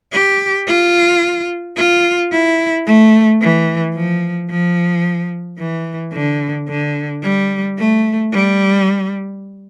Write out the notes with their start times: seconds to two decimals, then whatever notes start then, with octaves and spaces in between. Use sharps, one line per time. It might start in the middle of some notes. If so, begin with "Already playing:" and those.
0.12 G4
0.67 F4
1.77 F4
2.32 E4
2.86 A3
3.41 E3
3.95 F3
4.50 F3
5.58 E3
6.13 D3
6.69 D3
7.23 G3
7.78 A3
8.32 G3